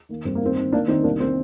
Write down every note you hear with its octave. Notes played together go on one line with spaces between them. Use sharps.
D#3 A#3
G2 C4
A#3
D#3 C4
D#3
D#3 A#3 D4
D#3 C4 D#4
C2 A#3 D4
C4